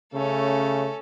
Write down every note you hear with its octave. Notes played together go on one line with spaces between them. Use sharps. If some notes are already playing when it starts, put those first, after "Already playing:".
C#3 A3 C#4 A4